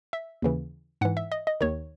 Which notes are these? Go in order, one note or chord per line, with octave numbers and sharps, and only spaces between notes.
E5
D#2 C#3 E3
G#2 E3 F#5
E5
D#5
D#5
D#2 D#3 C#5